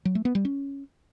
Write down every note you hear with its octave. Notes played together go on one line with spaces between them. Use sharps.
F#3
A3
B3
G3
C#4